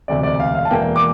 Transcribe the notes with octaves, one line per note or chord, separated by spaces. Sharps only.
E1 D2 C3 D5
D5
F5
F5
A5
E1 E2 E3 A#3 G5
D6